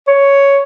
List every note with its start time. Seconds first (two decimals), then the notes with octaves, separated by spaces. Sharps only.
0.08 C#5